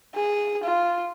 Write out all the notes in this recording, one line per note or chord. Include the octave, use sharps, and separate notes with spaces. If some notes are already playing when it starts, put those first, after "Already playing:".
G#4
F4